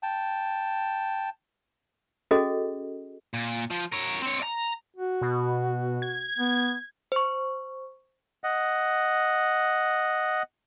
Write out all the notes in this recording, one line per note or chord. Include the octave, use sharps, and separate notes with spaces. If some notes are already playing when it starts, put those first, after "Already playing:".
G5 A5
C#4 F#4 G#4 A4 D#5
A#2
F3
A#4 C#5
C4 C#5
D5 A#5
F#4
B2
G#6
B3
C5 C#6
D#5 F#5